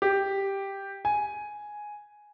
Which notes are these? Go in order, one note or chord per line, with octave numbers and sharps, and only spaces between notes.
G4
G#5